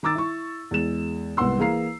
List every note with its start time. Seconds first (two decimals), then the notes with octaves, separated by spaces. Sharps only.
0.03 D#3 A#5 D6 E6 A6
0.15 E4 C#6
0.71 E2 G#3 E7
1.37 C2 G#2 B3 F#5 C6 E6
1.58 E3 A#3 G#4 F5 A#5 C7